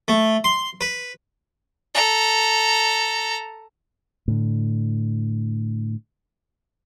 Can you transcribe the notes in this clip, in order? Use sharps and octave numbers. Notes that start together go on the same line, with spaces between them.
A3
C6
B4
A4 A#5
A2 D3